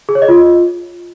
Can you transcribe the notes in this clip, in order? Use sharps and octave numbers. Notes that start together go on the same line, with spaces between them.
G#4
C#5
D#5
F4